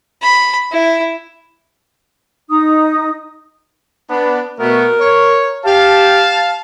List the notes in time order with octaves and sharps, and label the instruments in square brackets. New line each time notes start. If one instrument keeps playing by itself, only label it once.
[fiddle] B5
E4
[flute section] D#4 D#6
[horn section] B3 D4
[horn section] B2 A3 B3 [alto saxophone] A#4
[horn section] C#5
[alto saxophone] G4 [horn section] F5 A5